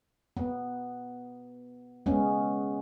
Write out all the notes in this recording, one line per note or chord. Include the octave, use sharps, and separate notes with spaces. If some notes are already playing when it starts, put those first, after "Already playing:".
B3
G#3 B3 C#4